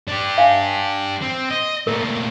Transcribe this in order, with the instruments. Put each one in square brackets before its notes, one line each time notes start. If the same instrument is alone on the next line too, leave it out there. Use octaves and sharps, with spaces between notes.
[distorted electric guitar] D4 G4
[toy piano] F5 G#5
[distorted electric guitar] C4
D#5
[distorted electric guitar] A#2 A3 [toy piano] A#4